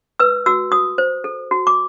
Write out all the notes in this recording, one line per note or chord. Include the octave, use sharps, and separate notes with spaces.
B4 E6
F#4 E6
F#4 D#6
C5
A4
F#4
D6